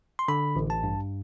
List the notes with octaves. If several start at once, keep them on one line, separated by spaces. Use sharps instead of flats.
C6
D3 B5
A1
A5
G2